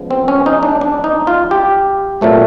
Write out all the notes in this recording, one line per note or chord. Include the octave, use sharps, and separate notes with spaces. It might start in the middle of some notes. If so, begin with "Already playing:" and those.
Already playing: C#3 F3 G#3 B3
C4
C#4
D#4
D4
D4
D#4
F4
G4
A#2 F#3 A3 C4